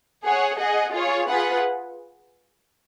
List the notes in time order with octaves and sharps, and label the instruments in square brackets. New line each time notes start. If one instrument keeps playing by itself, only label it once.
[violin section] G#4 C#5 F#5
G#4 D#5 F#5
F4 G#4 C#5
F4 G#4 B4 F#5